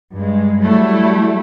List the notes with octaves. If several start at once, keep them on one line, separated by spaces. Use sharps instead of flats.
G2 G#3
F#3 G3 A3 E4